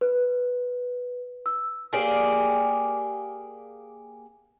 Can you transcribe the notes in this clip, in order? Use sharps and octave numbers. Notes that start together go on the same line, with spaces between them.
B4
E6
A#3 G4 G#4 D5